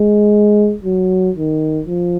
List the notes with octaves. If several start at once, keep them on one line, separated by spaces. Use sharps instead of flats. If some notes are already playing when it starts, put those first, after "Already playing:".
Already playing: G#3
F#3
D#3
F3